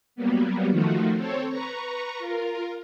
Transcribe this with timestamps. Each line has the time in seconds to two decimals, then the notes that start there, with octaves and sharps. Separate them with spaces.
0.16 F#3 G3 A#3 B3
0.70 D#3 F3 A3 F4 F#4
1.16 C4 A4 C5 C#5
1.49 B4 A#5 C#6
2.19 F4 A#4